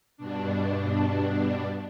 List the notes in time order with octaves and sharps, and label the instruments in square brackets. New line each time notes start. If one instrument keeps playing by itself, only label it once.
[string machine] G2 B2 D4